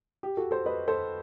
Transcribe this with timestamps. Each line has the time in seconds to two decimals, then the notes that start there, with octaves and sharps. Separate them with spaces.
0.23 G4
0.37 F#4 A4
0.51 A4 C5
0.66 B4 D#5
0.88 A4 C5